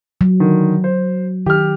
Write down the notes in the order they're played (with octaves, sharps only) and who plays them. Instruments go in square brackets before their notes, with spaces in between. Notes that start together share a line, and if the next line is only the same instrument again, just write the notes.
[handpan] F#3
[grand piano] D3 D#3
C5
[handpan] D#3 [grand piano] G4 F6